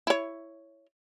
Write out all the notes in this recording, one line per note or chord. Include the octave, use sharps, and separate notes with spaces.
E4 C#5